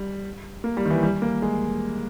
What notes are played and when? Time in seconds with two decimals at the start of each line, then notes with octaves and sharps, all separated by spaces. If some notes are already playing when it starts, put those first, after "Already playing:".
Already playing: G3
0.64 A#3
0.77 G3
0.85 D#3
0.90 E3
1.03 G3
1.22 A#3
1.42 G#3